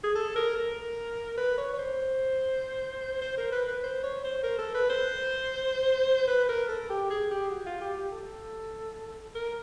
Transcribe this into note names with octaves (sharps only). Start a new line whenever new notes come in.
G#4
A4
A#4
A#4
B4
C#5
C#5
C5
C5
A#4
B4
B4
C5
C#5
C5
A#4
A4
B4
C5
B4
A#4
A4
G4
G#4
G4
F#4
F4
G4
G4
A4
A#4